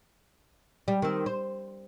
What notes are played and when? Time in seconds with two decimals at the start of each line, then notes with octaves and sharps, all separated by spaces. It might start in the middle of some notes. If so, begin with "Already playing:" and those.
0.88 G3
1.02 D#3 C4
1.26 C5